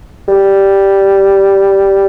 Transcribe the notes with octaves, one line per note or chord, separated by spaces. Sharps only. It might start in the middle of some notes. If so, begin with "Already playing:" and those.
G3